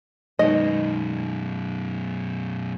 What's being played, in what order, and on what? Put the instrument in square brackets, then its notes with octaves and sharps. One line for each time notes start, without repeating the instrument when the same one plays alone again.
[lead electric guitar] F#2 B2 [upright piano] D#3 G#3 B3 [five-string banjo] D#5